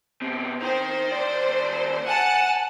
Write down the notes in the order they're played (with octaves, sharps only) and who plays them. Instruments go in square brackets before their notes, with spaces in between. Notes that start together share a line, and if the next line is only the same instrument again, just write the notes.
[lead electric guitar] B2 C4
[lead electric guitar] D#4 G5 [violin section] C5
[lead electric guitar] D#2 D5
[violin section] F#5 A5 [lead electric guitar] G#5